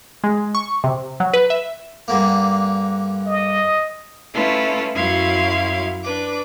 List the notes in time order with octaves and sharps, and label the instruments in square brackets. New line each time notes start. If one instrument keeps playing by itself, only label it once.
[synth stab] G#3
C#6
C3
F#3
B4
E5
[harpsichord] G2 D3 A#3
[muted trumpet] D#5
[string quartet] A3 C#4 E4 F4 A4 B4
F#2 F#3 E4 F5 C6 G#6
D4 B4 D6